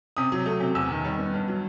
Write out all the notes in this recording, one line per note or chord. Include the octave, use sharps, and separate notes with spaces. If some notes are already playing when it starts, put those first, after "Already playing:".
C3 D#6
F#3
A3
C3
E2 E6
D#3
G3
B3
G2
F#3